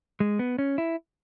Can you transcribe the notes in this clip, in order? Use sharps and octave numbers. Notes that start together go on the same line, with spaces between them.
G#3
B3
C#4
E4